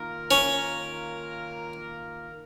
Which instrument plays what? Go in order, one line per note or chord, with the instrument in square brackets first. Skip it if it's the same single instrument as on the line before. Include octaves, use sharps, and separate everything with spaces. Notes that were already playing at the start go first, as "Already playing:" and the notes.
Already playing: [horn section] D#3 A#3 F4 A#4
[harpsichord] C#4